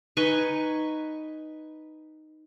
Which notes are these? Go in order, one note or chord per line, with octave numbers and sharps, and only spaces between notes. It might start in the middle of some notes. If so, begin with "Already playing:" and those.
D#4 B4 G#5 C#6